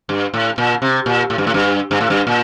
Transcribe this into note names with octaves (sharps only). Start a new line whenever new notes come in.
G2
A2
A#2
C3
A#2
A2
G2
A2
G2
G2
A2
G2
A#2